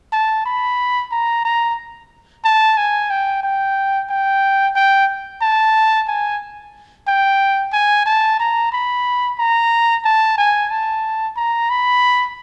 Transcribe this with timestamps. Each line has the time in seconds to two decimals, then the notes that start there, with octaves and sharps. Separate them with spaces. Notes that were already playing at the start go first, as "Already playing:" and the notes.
0.13 A5
0.46 B5
1.11 A#5
1.45 A#5
2.45 A5
2.77 G#5
3.10 G5
3.43 G5
4.09 G5
4.76 G5
5.41 A5
6.08 G#5
7.07 G5
7.73 G#5
8.06 A5
8.39 A#5
8.72 B5
9.39 A#5
10.05 A5
10.38 G#5
10.71 A5
11.37 A#5
11.70 B5